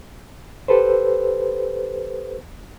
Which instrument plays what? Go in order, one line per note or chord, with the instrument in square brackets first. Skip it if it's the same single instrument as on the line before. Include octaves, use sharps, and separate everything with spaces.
[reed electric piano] G4 A4 B4 C5